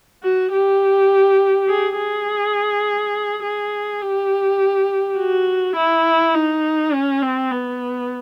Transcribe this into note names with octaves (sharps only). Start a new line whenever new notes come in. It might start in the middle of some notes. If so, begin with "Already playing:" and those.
F#4
G4
G#4
G#4
G#4
G4
F#4
E4
D#4
C#4
C4
B3